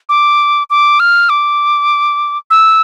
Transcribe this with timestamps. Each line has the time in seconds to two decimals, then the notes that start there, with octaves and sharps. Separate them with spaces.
0.09 D6
0.70 D6
1.00 F6
1.29 D6
2.50 E6